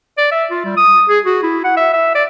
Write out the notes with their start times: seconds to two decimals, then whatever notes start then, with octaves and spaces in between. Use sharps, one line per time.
0.18 D5
0.32 E5
0.51 F4
0.65 G3
0.77 D#6
1.09 G#4
1.26 F#4
1.43 E4
1.64 F#5
1.77 E5
1.93 E5
2.15 D5